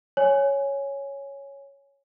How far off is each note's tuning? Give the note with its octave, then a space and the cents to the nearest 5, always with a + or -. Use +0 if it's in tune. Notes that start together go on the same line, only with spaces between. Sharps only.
C#5 +0 G#5 +0